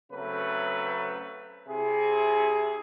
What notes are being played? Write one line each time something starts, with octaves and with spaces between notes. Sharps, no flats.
C#3 F#3 A3 C4 B4
C3 E4 G#4